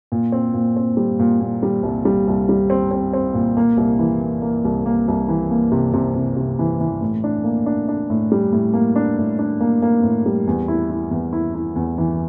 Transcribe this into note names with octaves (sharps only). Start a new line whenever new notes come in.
A#2
C4
A#2
C4
G3
A#2
A#2
G3
C2
G3
C2
G3
C4
C4
C4
A#2
A#3
C2
E3
A#3
A#3
C2
A#3
C2
E3
A#3
C3
C3
C3
C3
E3
E3
A2
D4
A#3
D4
D4
A2
G3
A2
A#3
D4
A2
D4
A#3
A#3
A2
G3
E2
E4
E4
E2
E4
E4
E2
E3